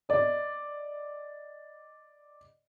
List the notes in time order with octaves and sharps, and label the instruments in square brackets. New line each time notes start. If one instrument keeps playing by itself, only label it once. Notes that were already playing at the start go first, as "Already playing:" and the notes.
[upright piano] D5 D#5